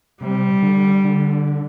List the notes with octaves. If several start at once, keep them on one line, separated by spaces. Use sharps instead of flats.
C3 G3
D3
D3